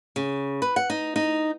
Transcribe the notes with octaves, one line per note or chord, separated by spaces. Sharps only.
C#3
B4
F#5
D#4
D#4